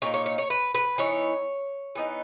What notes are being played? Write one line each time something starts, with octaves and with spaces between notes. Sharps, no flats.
A#2 A#3 D#4 C#5
C#5
C#5
C#5
B4
B4
E3 B3 D#4 C#5
E3 B3 D#4